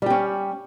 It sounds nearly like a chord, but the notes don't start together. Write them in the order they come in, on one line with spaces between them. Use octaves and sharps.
G3 G4 C#4